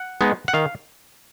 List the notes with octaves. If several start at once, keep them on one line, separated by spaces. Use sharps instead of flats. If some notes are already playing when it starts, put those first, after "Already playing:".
Already playing: F#5
G#3 B3 D#4
F#5
D#3 F5